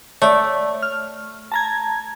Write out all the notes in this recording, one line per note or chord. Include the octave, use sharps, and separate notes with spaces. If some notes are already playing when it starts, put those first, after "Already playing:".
A3 C#5 D5
F6
A5 A#5 G#6